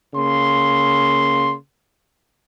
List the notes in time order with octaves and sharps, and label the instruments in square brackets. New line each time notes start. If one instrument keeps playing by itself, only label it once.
[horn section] C#3 A#3 C6